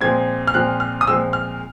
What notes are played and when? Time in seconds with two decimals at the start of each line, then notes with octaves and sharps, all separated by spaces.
0.01 A#2 F3 G#3 C4 G#6
0.47 F6
0.54 A#2 F3 G#3 C4 F#6
0.80 F6
1.01 D#6
1.07 A#2 F3 G#3 C4 E6
1.33 F6